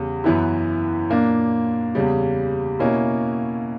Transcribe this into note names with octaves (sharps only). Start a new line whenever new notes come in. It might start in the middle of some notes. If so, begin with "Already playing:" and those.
Already playing: E2 C#3 G3
F#2 E3 B3 E4
A#2 A#3 D4
E2 C#3 G3
B2 A#3 C#4 E4